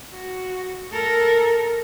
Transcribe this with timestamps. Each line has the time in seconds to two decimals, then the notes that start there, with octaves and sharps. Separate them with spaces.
0.13 F#4
0.92 A4 A#4